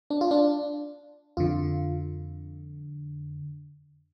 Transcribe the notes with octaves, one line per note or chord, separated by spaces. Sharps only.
D4
F4
D4
F2 D3 F4